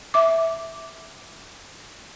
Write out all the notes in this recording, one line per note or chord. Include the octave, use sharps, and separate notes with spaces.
E5 D6